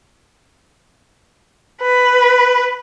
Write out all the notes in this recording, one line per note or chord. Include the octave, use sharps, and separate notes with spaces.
B4